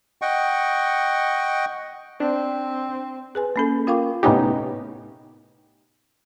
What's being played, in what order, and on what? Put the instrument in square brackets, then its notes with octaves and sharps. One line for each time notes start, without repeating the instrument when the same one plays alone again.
[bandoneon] D#5 F#5 G5 C#6
[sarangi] C4 [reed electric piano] D4
[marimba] G#4 B4 G#5
A#3 C#4 A4
F4 A#4 F5 G5 C#6 D6
[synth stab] A2 C3 B3 C#4 D#4 G4